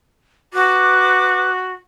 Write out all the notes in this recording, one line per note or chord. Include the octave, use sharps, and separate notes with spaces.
F#4 B4 D6 F#6